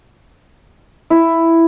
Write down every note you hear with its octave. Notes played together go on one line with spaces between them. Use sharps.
E4